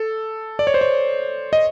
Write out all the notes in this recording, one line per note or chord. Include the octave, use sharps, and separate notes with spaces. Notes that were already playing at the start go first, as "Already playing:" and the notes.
Already playing: A4
D5
C#5
C5
C#5
D#5